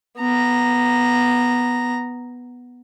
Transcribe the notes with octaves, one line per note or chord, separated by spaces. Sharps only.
B3 A#5